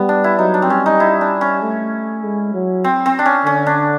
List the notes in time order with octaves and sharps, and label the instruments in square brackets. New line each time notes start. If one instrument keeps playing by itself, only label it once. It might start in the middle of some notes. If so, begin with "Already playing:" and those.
Already playing: [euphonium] G3 [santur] B3
[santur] D4
E4
[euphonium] F#3 [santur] D#4
[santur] D4
C4
[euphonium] G3 [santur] C#4
[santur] D#4
E4
D4
C#4
[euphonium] A3
G#3
F#3
[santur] C4
C4
D4
C#4
[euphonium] D3 [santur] C#4
[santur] D4